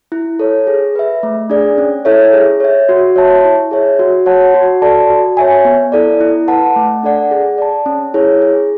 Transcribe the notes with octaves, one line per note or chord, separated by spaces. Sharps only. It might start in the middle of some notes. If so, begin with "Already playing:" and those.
E4
A4 C#5
G#4
B4 E5
A3
D4 G#4 D5
C#4
E4 A4 C#5 E5
G#4
C#5 E5
F#4
C#5 E5 A5
E4
G#4 C#5 E5
F#4
C#5 F#5 A5
F#4
A4 D5 A5
F#4
C#5 E5 G#5
B3
E4 A4 D5
E4
B4 F#5 A5
A3
D4 A4 D5 F#5
G#4
D5 A5
C#4
E4 G#4 C#5
G#4